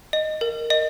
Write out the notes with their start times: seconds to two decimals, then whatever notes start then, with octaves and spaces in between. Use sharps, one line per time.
0.13 D#5
0.41 A#4
0.70 D#5